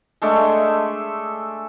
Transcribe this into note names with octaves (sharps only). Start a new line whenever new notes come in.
G#3 A3 D4 E5